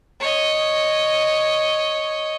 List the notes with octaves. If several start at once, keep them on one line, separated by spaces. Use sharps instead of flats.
C#5 D#5